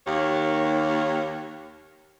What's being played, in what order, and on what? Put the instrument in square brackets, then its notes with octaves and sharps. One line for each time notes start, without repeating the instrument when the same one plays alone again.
[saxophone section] D#2 C#5